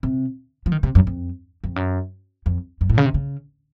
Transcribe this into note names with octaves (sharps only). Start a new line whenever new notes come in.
C3
F3
D#3
C3
F#2
F2
F2
F#2
F2
F#2
A2
C#3
C3
C#3